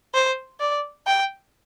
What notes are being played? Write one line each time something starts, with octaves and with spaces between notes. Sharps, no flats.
C5
D5
G5